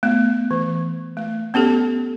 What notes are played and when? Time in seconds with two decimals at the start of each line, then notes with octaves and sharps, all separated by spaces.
0.03 A3 B3
0.51 E3
1.17 A3
1.54 B3 C#4 G4 A4